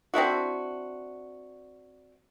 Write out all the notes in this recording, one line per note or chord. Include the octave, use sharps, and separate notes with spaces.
C4 D4 E4 F#4